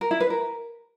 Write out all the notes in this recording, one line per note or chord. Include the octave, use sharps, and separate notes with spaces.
A#4
E4
B4
A#4